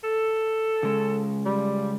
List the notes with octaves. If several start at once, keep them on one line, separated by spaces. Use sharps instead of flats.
A4
C#3 G#3
G3